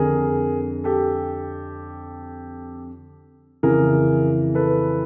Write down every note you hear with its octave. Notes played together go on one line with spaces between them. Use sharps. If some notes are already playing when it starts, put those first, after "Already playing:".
Already playing: F2 D3 G#4 A#4
G4 A4
F2 C#3 E3 G#4 A#4
A4 B4